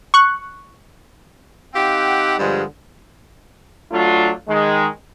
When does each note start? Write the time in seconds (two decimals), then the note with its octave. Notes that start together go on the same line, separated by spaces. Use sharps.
0.14 C#6 F#6
1.75 C4 D#4 G4 F5 F#5
2.39 G2 D3 F3 G3 G#3
3.92 F#3 A3 D4 F4
4.48 D#3 G#3